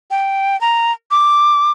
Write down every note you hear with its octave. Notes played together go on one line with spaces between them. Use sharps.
G5
A#5
D6